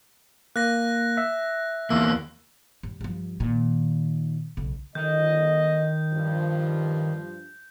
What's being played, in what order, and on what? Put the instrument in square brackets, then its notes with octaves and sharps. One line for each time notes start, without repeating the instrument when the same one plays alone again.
[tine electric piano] A#3 [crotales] F#6 A#6
[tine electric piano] E5
[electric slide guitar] E2 A#3 [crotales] E6
[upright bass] G2
G2 F3
A#2 D#3
B1 C#3
[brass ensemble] G1 D#5 [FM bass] D#3 [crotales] G6
[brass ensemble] G2 F3